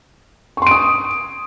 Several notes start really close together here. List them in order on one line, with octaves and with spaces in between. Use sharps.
C#6 C6 D7 D#6